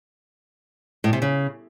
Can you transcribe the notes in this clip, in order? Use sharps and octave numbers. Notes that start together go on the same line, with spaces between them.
A2
C3
C#3